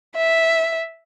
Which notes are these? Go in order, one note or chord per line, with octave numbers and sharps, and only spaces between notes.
E5